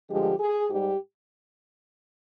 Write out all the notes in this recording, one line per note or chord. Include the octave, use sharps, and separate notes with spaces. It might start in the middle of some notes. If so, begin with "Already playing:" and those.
G2 D3 F3 G#3 G4
G#4
G#2 G3 G4